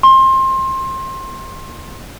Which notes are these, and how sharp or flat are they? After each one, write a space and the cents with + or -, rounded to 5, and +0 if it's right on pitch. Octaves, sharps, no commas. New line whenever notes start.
C6 +25